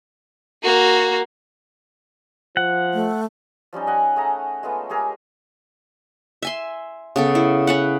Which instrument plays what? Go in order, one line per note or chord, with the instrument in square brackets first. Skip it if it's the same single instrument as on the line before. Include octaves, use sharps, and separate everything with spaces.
[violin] A#3 F#4
[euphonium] F3 [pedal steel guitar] F#5
[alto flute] A3
[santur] F3 G3 C#4 D#4
D#5 F#5 G#5
A3 G#4 A#5
G#3 A3 B3 F4
G#3 G4 G#4 A#4
[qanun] E5 G#5 C6
C#3 B3 A4
E4
C#4 B4 F#5